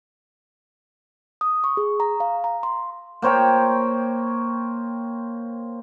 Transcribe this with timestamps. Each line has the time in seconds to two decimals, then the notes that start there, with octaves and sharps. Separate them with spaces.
1.41 D#6
1.64 C#6
1.77 G#4
2.00 A#5
2.20 F5
2.44 A#5
2.63 C6
3.22 A#3 C5 C#5 G5